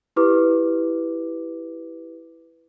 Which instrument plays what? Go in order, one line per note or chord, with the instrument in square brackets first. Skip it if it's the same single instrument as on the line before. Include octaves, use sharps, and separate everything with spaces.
[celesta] E4 G4 B4 D6